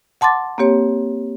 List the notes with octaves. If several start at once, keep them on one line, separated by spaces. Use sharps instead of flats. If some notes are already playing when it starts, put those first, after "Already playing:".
F#5 A5 C6 D6 A6
A#3 C4 G4 C#5